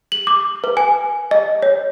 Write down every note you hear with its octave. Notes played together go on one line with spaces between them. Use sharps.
F#7
D6
B4
G#5
D#5
C#5